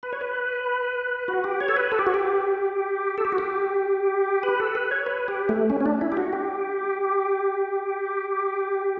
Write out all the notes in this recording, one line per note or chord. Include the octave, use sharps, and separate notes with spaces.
B4
C#5
B4
F#4
G4
C#5
A4
B4
A4
G4
F#4
G4
A4
G4
F#4
G4
B4
A4
B4
C#5
B4
G4
A3
C#4
C#4
D4
E4
G4
F#4
G4